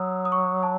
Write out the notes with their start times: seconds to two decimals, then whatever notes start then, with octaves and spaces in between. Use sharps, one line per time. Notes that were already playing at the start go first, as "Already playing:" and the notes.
Already playing: F#3 D#6 E6
0.25 D#6
0.32 C#6
0.63 A5